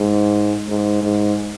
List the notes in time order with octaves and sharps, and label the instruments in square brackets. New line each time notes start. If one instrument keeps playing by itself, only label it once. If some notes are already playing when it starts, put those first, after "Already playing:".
Already playing: [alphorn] G#2
G#2
G#2